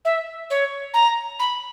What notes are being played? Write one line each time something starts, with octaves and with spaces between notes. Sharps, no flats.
E5
C#5
A#5
B5